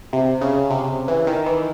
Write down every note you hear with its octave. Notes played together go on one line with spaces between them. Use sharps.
C3
C#3
C3
E3
D#3
E3